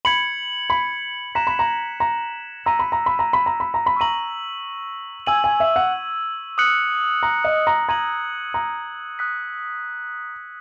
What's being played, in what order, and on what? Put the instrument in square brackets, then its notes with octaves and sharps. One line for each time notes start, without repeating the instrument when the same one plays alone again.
[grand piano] B5 [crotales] G#6 C#7 F#7
[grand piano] B5
[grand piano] A#5 [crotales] F#6 B6 E7
[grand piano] B5
A#5
A#5
[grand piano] A#5 [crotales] E6 B6 D#7
[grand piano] B5
A#5
B5
A#5
B5
A#5
B5
A#5
B5
[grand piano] A#5 [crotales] C#6 E6 B6 D#7 F#7
[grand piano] G#5 [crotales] E6 G#6 D#7 F#7
[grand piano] G#5
E5
F#5
[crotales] D#6 F#6 C#7 F#7
[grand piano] A#5
D#5
A#5
[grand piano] A#5 [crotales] G#6 D#7 F#7
[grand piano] A#5
[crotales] D#6 F#6 B6